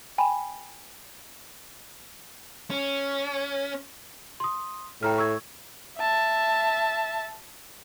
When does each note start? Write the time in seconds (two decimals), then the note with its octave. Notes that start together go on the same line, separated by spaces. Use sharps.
0.18 G5 G#5 B5
2.70 C#4
4.40 C6 D#6
5.03 A2 G5 A#5 F6
5.18 C#6 E6 G#6
5.98 E5 A5